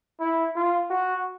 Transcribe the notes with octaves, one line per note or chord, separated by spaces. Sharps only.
E4
F4
F#4